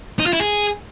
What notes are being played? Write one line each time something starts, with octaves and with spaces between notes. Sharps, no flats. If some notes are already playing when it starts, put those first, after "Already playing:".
D#4
F4
E4
G#4